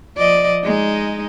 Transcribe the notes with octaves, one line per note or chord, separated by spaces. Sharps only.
F3 D5 D#5
G#3 D#4